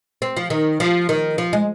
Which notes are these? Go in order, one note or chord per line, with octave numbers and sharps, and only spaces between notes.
C4
F3
D#3
F3
D#3
F3
G#3